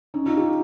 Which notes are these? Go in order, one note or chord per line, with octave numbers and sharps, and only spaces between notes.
C#4 D#4
D#4 F4
F4 G4